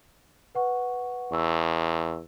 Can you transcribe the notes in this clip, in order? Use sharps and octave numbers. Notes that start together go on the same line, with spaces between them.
B4 F#5 C#6
E2 C#6 E6